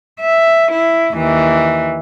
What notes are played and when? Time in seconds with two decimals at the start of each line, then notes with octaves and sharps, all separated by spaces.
0.20 E5
0.72 E4
1.14 D#2 E3